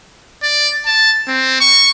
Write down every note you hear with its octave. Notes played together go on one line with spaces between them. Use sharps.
D5
A5
C4
C#6